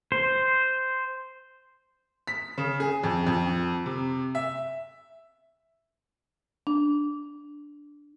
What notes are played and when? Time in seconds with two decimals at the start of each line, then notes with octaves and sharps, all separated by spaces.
0.12 C5
2.27 B6
2.58 C#3
2.80 G#4
3.03 F2
3.27 F2
3.86 C3
4.35 E5
6.67 D4